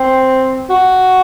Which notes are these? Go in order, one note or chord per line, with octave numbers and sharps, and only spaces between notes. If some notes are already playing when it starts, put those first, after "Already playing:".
Already playing: C4
F#4